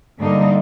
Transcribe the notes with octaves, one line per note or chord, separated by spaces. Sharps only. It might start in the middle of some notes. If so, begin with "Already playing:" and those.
G2 D3 G3 A#3 D#4